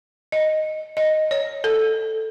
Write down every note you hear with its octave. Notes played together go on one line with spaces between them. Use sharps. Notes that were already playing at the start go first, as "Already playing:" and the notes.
D#5
D#5
C#5
A4